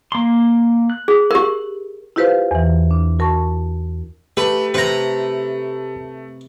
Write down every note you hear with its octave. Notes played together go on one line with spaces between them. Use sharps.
A#3 C6
F#6
G#4
G4 A#4
E4 F4 G4 B4 C5 F5
E2 E3
D4
F#4 A#4 A5 C#6
A3 G4 B4
C3 B4 A#5